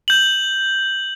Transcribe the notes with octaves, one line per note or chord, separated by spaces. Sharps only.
G6 F#7